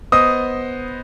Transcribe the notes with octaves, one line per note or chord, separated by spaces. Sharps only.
B3 C5 D#5 D#6